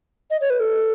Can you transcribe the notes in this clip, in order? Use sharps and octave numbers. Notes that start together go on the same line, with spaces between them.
D#5
C#5
B4
A4